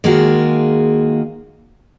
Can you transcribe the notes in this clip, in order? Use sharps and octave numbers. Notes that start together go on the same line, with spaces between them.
D#3 G#3 A#3 F4 F#4 G#4